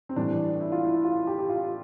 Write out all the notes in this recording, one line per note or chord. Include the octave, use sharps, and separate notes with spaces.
C4
A2 E3 G3 D4
E4
F4
E4
F4
G4
G4
F4